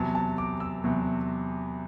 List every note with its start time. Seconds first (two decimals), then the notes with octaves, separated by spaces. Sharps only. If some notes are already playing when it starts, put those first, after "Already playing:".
Already playing: E2 C3 F#3 A5
0.15 A5
0.38 D6
0.60 E6
0.84 E2 C3 F#3